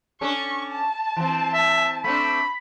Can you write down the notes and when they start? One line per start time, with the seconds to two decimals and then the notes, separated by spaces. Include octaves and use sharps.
0.21 C#4 D4 A4 C#6
0.71 A5
1.16 E3 C4
1.53 E5
2.04 A3 C4 D4 B5